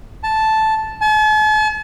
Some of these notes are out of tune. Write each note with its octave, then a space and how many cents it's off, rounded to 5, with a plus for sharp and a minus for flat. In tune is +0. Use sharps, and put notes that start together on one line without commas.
A5 -5
A5 -45